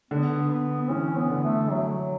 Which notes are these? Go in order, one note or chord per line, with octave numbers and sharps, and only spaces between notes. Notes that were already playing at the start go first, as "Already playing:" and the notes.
D3 B3
B3
B3
E3 C#4
B3
D3
A3
F#3